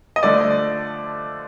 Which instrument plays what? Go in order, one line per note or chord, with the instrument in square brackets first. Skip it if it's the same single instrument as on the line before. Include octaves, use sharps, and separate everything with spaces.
[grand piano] D#5
D3 F3 A3 D5